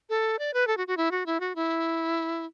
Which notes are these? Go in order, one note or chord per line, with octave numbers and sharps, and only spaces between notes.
A4
D5
B4
A4
F#4
F#4
E4
F#4
E4
F#4
E4